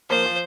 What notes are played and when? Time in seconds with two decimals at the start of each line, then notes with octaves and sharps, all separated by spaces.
0.10 F3 A#3 C5
0.26 F3